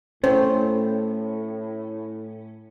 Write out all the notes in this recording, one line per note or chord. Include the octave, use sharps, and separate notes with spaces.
A2 A3 C#4 C5